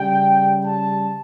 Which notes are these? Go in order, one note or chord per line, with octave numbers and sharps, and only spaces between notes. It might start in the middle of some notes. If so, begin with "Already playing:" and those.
Already playing: C#3 G3 G5
A5